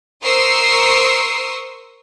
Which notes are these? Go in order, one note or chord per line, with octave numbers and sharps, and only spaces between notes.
A#4 C5 C#6 D#6 E6 C7